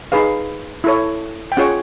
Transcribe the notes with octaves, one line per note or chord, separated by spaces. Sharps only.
D#4 G#4 B4 F5
E4 A4 C#5
G5
C#4 F4 G#4 C#5 F#5